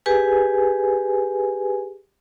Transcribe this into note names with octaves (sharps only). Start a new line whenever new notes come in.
G4 G#4 B4 G#5